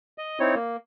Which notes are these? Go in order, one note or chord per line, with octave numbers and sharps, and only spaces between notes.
D#5
C4 D#4 E4 C#5
A#3